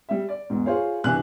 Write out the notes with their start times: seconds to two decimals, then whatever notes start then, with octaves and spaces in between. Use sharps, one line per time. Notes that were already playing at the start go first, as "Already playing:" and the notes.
0.09 G3 E5
0.29 D5
0.50 E2 G#2
0.66 F4 G#4 C5 C#5 F5
1.04 C2 G2 E3 G#5 F#6 F#7